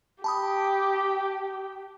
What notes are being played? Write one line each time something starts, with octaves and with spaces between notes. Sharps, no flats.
G4 A5 B5 D#6